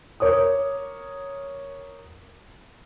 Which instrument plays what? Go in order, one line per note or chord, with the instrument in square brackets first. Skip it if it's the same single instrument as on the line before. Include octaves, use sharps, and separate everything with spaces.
[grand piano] A#4 C#5 D6 D#6